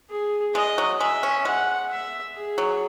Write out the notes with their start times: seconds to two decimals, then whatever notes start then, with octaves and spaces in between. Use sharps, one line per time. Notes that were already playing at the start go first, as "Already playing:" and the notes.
0.10 G#4
0.55 G#3 D#5
0.78 F#3
1.00 G#3 E5
1.23 C#4
1.45 G#3 F#5
1.90 E5
2.35 G#4
2.58 F#3